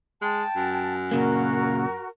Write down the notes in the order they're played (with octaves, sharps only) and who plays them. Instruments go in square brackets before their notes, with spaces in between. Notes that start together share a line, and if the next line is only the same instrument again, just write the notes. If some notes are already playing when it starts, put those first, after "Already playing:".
[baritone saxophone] G#3 [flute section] G5 A5
[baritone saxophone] F#2
[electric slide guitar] A#2 C#3 A#3 [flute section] F#4 A#4